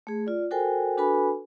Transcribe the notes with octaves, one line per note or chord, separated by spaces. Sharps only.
A3 G#4
F4 D5
F#4 A4 A#4 C5 G5 G#5
D4 F#4 A4 B4 G#5 B5